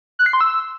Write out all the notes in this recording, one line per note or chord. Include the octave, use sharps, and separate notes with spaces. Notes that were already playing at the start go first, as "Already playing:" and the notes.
F#6
C7
C6
E6